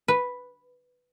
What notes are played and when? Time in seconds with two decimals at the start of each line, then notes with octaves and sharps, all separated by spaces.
0.08 B4